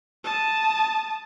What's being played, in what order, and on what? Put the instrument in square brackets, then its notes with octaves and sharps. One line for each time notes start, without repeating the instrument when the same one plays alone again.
[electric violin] A5 D#6